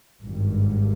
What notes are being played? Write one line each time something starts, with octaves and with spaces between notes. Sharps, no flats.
G#1 G2